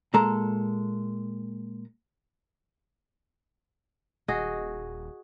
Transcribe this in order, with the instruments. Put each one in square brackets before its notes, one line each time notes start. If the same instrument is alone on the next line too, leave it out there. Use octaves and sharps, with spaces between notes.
[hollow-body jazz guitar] A#2 G#3 A4 A#5
[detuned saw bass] D#1 [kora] F#4 G#4 D#5